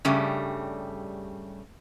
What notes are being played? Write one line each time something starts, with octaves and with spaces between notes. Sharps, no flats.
G2 C#3 G3 A3